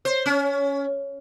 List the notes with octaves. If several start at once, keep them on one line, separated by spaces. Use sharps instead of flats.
C5
C#4